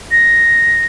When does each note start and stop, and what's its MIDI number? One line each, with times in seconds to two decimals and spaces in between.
0.11 0.86 94